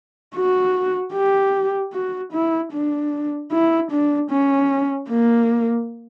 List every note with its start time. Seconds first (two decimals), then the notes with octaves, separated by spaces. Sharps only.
0.35 F#4
1.14 G4
1.93 F#4
2.33 E4
2.72 D4
3.52 E4
3.91 D4
4.31 C#4
5.10 A#3